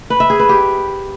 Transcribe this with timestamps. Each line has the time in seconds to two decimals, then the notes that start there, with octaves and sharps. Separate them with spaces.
0.10 B4
0.20 E5
0.30 G#4
0.40 B4
0.49 G4